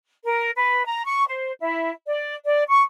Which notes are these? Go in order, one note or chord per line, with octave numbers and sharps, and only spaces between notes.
A#4
B4
A#5
C#6
C5
E4
D5
D5
C#6